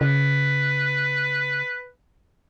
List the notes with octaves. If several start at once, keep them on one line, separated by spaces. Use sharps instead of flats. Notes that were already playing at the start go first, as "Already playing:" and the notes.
C#3 B4